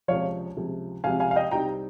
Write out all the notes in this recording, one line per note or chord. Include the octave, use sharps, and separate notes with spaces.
C#2 C3 F3 C#5 F5
C#2 C3 F3
C#2 C3 F3 F5 G#5
F5 G#5
F5
D#5 G5
C2 C3 G3 C4 D#4 G5 A#5